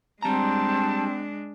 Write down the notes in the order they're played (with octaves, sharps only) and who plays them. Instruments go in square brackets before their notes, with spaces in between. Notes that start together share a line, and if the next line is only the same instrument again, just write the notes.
[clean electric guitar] G3 A#5 [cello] G#3 D4 [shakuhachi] C4 [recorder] A5